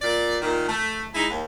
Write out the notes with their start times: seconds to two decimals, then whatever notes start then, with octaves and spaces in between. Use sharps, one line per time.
0.01 A#2 D5
0.42 A#2 D#3
0.68 A3
1.14 G#3 D#4 E4
1.30 D#2